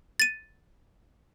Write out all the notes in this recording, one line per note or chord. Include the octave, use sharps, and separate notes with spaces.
A6 D#7